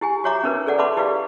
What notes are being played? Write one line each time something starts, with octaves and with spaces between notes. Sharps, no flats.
E4 G4 G#5
F#4 G4 C#5 E5 A#5 D6
C#4 D#4 A#4 B4
G#4 A4 D5 F#5
B4 E5 A5 B5 C6 D6
E4 G4 B4 D5 F5